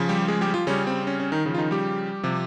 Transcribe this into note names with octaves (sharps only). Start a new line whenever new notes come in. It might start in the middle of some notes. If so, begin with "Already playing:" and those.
Already playing: C#3 F3
G3 G4
G#3 G#4
G3 G4
F3 F4
C#3 G3 C#4
C4
C#4
C#4
D#3 D#4
C#3 F3
F4
D#3 D#4
G3 G4
C3 F3